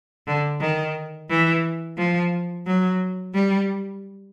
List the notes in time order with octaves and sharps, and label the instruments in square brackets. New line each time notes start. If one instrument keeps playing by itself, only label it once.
[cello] D3
D#3
E3
F3
F#3
G3